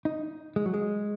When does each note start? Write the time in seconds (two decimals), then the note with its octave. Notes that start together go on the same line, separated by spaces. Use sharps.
0.05 D#4
0.56 G#3
0.66 F#3
0.74 G#3